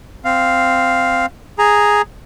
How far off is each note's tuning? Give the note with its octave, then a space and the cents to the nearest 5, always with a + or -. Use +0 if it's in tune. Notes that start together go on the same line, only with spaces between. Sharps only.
C4 -5 F5 +0
G#4 +0 A#5 +0